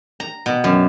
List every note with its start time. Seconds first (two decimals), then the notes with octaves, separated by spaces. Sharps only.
0.20 A#5
0.46 B2
0.64 F#2